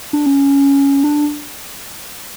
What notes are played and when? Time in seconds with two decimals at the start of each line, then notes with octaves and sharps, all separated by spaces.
0.13 D4
0.26 C#4
1.04 D4